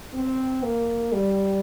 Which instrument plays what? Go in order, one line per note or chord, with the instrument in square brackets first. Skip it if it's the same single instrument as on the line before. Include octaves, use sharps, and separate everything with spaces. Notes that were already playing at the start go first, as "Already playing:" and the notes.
[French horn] C4
A#3
G3